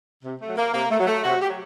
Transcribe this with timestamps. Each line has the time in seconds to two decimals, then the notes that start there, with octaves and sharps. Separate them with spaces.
0.24 C3
0.40 A3
0.48 F#3
0.56 A#3
0.73 C3 A#3
0.90 A3
0.99 F#3
1.06 A3
1.23 C3 F#4
1.41 G4
1.49 F#3